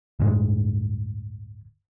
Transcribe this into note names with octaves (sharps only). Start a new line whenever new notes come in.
D1 D2 G2 G#3